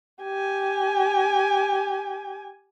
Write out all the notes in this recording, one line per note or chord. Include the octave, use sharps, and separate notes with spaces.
G4 G#5